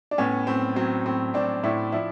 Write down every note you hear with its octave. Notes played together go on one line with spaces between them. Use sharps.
D4
A2 B3 C#4
A2 C4
F#3 C4
A2 C4
A2 C4 D4
A2 D4 E4
F3 D4 E4